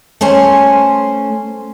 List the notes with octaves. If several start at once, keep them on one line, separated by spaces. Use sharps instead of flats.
A3 C#4 C5 G#5